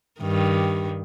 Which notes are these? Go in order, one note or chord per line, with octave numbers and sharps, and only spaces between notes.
G2 D#3